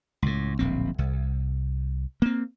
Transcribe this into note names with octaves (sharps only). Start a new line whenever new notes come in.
C#2 A2
D1 A#1 C4
C2
A#3 C4